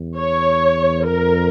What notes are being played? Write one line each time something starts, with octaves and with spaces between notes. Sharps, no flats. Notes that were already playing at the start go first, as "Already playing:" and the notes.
Already playing: E2
C#5
F2 A#4